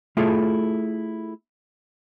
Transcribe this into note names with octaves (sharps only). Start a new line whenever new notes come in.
A3 E4 F4 G#4 A4